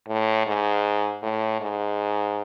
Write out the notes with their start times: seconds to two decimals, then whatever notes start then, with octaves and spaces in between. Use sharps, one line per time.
0.08 A2
0.47 G#2
1.23 A2
1.61 G#2